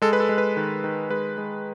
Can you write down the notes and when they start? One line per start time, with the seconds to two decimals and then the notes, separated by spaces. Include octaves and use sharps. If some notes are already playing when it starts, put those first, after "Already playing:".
0.02 G#3 A4
0.13 B4
0.20 A4
0.29 G#3
0.38 B4
0.57 D#3
0.84 D#3
1.10 G#3 B4
1.38 G#3